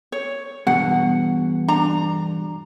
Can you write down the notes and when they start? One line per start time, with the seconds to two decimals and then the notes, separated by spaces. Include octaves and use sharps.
0.12 C#5
0.67 E2 G2 B2 F#5
1.68 D4 A#5